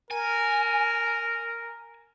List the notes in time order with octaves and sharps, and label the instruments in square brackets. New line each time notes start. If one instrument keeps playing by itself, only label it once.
[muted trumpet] A#4 [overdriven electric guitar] G#5